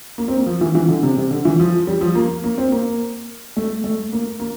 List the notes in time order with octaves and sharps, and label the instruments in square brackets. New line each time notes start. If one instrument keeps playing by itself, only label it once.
[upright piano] A#3
C4
A#3
F3
E3
E3
D3
C3
C3
D3
E3
F3
G3
F3
A#3
A#3
C4
A#3
A3
A3
A#3
A#3